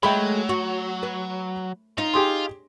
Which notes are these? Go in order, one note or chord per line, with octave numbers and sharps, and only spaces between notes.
F#3 G#3 A3 G5 B5
F#4
B4
D#4 F4
G4 G#4 C6